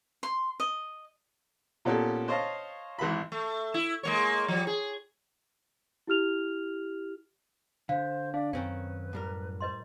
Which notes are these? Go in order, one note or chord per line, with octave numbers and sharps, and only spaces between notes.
C6
D#5
A#2 B3 C#4 G4 A4
C5 C#5 D#5 F5 A5
G#1 E3 F#4 B5
A3
E4
G#3 A#3 C#5
F3 G3
G#4
E4 G4 F6 F7
D3 C5 F5
D4 D5 F5
F#2 D#3 C4 C#4 B4
A2 G3 A#4
B4 C5 D#5 C6